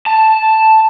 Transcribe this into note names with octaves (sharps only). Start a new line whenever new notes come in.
A5